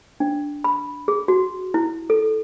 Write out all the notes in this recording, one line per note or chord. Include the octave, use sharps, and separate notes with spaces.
D4
B5
G#4
F#4
E4
A4